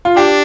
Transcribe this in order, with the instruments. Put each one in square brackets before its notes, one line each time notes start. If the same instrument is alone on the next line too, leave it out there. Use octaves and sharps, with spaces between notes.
[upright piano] F4
[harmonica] D4 [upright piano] G4